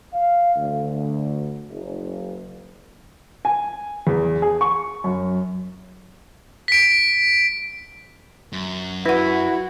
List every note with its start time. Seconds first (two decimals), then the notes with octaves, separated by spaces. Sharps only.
0.13 F5
0.56 D2
1.70 F#1
3.45 G#5
4.07 E2
4.42 G#4
4.61 C#6
5.04 F#2
6.68 B6 D7
8.53 F#2
9.06 E4 F#4 B4 F#5